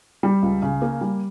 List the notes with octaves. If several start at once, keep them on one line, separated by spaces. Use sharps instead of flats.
G3
C#2
C#3
A#3
G3